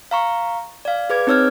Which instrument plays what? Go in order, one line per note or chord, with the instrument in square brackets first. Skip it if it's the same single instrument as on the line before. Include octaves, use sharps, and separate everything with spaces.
[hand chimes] F5 A#5 C#6
D5 F5
G#4 B4 D6 G#6
C4 D#4 C#5 E6 F6 G#6